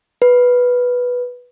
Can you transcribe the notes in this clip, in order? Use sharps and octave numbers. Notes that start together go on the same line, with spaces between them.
B4